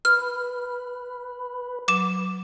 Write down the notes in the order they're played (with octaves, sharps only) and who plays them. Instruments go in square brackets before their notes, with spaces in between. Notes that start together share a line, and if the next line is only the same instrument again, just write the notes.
[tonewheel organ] B4 [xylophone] F6
[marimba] F#3 [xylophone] D6 E7